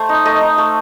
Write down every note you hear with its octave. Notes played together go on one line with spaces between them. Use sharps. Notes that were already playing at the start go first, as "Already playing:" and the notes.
Already playing: A3 C5
D#4
A3 D#5
D#4
A3